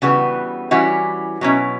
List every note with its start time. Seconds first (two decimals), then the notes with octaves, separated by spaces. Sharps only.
0.02 C#3 E3 G3 B3 F#4
0.71 E3 G3 C#4 E4 F#4
1.41 B2 F#3 C#4 E4